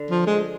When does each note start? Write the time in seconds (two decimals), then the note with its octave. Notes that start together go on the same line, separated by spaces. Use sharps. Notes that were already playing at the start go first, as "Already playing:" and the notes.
Already playing: D3
0.11 F3
0.27 G#3